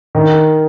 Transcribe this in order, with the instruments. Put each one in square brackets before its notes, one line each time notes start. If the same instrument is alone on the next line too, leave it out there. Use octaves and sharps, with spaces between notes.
[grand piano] D#3